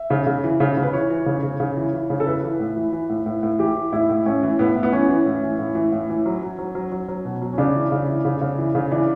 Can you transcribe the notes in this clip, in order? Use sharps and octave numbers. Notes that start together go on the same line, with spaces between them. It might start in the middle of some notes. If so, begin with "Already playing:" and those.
Already playing: E5
C#3
C#3
E3
C#3
C#3
B4
E3 C#5
E3
C#3
C#3
C#3
E3
E3
C#3
A4
E3 B4
E3
A2
E3
E3
A2
A2
A2
E3 G4
E3
A2 E4
A2
A2 C#4
E3
A2 B3
A2
B3
E3 C#4
E3
A2
E3
A2
E3
A2
E3
F#3
F#3
F#3
F#3
F#3
F#3
B2
F#3
C#4
C#3 D4
E3
C#3
E3
C#3
C#3
E3
C#3
E3 D4